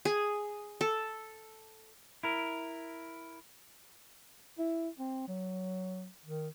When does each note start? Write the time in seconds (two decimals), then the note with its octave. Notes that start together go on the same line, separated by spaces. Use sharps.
0.05 G#4
0.81 A4
2.23 E4 A#4
4.59 E4
4.99 C4
5.28 F#3
6.25 D#3